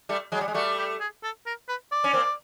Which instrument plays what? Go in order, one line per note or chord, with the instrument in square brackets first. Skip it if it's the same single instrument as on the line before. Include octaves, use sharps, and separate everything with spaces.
[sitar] G3 A3
F#3 G#3
G3
G#3
[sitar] G3 A3 [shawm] F#4
[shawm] G4
G#4
A4
A#4
B4
D5
[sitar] C#4
A#3 C4